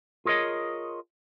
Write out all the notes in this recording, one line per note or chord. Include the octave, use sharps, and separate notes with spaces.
F4 G#4 A#4 C#5 D#5